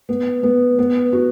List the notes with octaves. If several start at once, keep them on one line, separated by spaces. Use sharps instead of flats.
B3
B3
B3
F#4